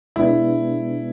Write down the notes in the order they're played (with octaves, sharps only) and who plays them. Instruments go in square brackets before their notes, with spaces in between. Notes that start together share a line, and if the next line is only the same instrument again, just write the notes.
[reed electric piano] B2 G#3 B3 D4 [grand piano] E4